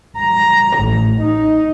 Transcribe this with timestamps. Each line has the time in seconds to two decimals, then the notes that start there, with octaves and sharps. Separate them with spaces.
0.18 A#5
0.79 A1
1.21 D#4